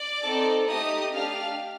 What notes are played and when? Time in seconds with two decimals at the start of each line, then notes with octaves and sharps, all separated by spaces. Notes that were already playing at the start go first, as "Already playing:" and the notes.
Already playing: D5 D6
0.22 C4 D#4 A4
0.67 A3 D#4 G4 D#5 D#6
1.12 D4 G4 F5 F6